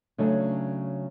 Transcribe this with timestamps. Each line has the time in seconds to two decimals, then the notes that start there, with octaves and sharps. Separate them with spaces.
0.18 C#3 F#3 A3 C#4 D4